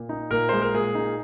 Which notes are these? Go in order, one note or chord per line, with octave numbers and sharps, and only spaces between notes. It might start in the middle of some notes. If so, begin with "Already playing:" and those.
Already playing: A#2
D#4
A#2 A#4
G#3 C5
A#4
A#2 G#4
D#4